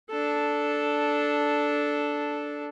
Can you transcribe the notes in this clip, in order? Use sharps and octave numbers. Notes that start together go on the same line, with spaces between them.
D4 A4